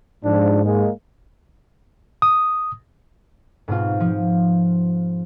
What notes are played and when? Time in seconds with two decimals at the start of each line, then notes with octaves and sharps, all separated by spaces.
0.24 G#2 F3 D4
0.65 G#3 A#3
2.22 D#6
3.68 G#2 B2 C4 F4
4.00 F3